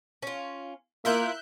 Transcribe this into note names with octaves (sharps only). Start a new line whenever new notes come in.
C#4 F4
A#3 E4 F4 A#4 E5 F#6 G6